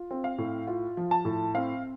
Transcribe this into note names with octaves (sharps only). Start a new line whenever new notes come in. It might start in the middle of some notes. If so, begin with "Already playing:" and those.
Already playing: F4
C4
F5
A2
F4
F3
A5
A2
C4 F5